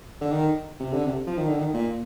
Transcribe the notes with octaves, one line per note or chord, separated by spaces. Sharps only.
D3
D#3
C3
D3
C3
F3
D#3
D3
D#3
A#2